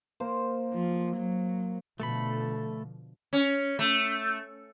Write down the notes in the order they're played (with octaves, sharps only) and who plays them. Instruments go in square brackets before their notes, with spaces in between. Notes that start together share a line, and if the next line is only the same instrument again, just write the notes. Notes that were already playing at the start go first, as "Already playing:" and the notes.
[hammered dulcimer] A#3 A#4 C5
[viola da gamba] F3
F#3
[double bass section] B2 D3 F3 [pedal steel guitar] A3 A4 B5
[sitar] C#4
A3